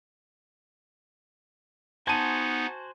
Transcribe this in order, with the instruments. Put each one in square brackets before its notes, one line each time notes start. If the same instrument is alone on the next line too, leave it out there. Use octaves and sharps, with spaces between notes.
[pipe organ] B3 D#4 [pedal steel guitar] F#4 C5 G#5 [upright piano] A5 D#7